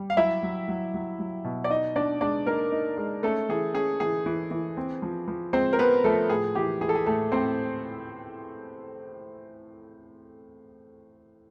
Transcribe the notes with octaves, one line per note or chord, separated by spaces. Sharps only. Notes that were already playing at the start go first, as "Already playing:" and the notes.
Already playing: G3
F5
F#3 E4 E5
F#3
F#3
F#3
F#3
B2
D5
D#4 D#5
B2 D4 D5
G#3 D4 D5
A#3 D#4 A#4
D#4
G#3
A3 C#4 A4
E3 G#4
C#4 G#4
E3 G#4
E3
E3
C4
F3
F3
G#3 C4 C5
A#4
B3 C4 B4
F3 A3 A4
A2 G#4
E3 G4
E3 G#4
A4
G#4
A2 A3 A4
A2 C4 C5